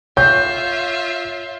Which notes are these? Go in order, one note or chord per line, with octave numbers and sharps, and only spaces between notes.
F4 C#5 E5 G6